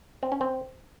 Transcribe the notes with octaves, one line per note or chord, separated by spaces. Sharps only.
C4
C#4
C4